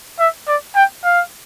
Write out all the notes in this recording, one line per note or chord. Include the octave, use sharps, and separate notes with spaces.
E5
D5
G5
F5